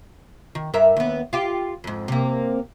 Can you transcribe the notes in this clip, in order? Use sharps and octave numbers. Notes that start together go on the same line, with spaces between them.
D#3
G2 A#4 E5
D#2 B3
F4 G4
F2 G#2
C3 A#3